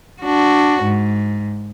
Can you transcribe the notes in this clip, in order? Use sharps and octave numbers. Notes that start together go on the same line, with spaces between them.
D4 F#4
G#2